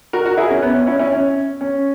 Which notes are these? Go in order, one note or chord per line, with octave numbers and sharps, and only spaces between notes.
F#4 A#4
F#4 A#4
E4 G#4
C#4
B3
C#4
C#4 E4
C#4 E4
C#4
C#4